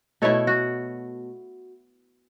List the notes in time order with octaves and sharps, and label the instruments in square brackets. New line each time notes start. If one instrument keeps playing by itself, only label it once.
[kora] B2 A3 E4 A4 C#5
F#4